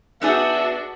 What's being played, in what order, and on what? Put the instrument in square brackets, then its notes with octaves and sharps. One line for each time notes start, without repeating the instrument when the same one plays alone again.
[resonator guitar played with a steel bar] B3 D#4 G#4 [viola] D4 F#4 [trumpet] E5